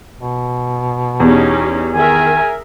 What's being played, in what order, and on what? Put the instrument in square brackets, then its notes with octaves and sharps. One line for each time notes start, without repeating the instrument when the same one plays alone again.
[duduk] B2
[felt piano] E2 [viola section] C#4 D#4 G4
[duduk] D#3 [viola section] G#4 A#4 E5 [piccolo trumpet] G#5